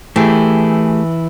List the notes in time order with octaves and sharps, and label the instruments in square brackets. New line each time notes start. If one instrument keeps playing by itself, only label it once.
[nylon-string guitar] E3 [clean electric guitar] A3 G4 G#4